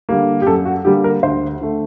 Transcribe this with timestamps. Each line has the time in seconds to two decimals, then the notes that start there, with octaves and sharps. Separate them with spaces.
0.09 D3 G3 A#3
0.42 G4
0.46 F#2 A4
0.65 F#4
0.85 D3 G3 A#3 G4
1.04 A#4
1.23 D2 C5
1.61 D3 A3